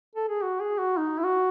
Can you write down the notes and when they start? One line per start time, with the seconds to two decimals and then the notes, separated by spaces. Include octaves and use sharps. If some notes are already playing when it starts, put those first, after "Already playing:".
0.16 A4
0.29 G#4
0.42 F#4
0.60 G#4
0.78 F#4
0.97 D#4
1.19 E4
1.24 F#4